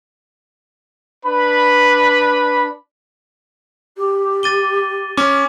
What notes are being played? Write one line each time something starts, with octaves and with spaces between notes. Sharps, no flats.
D4 B4 B5
G4
A6 D#7 G7
C#4 D6